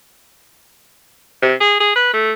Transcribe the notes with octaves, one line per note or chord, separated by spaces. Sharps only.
C3
G#4
G#4
B4
A3